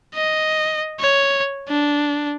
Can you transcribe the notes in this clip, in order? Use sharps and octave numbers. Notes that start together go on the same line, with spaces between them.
D#5
C#5
D4